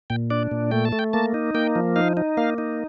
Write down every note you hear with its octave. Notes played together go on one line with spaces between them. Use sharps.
A#2 G5
D4 D5
A#2
A3 G5
A5
A3
G5
A#3 A5
D#4
A#3 G5
F3
D#4 F5
D#4
A#3 F5
D#4